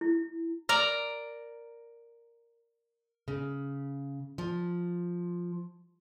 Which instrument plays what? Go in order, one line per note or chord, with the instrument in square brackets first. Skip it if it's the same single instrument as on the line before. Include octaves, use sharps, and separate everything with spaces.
[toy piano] E4
[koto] A#4 D5 A#5
[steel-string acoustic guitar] C#3
F3